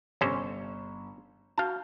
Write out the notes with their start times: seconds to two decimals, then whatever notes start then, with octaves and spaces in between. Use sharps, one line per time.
0.21 G1 C3 C#4 C5 C#6
1.58 F#4 F5 A5 G6